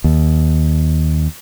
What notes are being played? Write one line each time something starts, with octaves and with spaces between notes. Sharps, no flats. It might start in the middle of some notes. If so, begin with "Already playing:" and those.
D#2